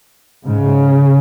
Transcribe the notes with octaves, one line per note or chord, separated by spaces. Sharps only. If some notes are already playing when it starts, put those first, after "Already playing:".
G#2 C#3